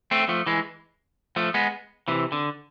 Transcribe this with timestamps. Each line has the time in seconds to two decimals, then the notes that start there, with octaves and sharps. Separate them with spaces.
0.11 A3 C4
0.28 F3 A3
0.46 E3 G#3
1.36 F3 A3
1.54 G#3 B3
2.08 C3 E3
2.32 D3